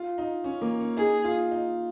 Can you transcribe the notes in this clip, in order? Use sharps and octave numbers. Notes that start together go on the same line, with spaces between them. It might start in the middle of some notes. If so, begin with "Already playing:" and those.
Already playing: F4
D#4
C#4
A#3
C#4
D#4 G#4
F4
D#4